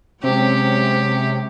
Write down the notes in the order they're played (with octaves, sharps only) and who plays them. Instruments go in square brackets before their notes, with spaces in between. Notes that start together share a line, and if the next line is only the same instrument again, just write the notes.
[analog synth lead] C3 [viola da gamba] F#3 G#3 C#4 [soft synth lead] C4 [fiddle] G4